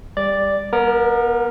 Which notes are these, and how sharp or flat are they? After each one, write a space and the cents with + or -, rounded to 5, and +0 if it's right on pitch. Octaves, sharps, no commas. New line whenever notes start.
G3 +20 D5 +0
B3 -35 A#4 +0